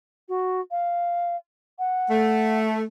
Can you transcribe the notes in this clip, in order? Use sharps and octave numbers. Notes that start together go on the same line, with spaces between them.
F#4
F5
F#5
A3